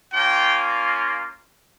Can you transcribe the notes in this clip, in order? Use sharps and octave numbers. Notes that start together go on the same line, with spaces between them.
A#3 C#4 F4 G5